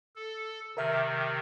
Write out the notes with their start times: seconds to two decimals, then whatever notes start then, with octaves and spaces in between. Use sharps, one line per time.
0.16 A4
0.77 C3 D#3 A#4 E5 F6